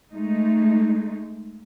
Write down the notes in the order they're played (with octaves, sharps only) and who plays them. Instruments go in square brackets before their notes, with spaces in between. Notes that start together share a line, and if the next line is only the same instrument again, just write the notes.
[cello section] G#3 A3 D#4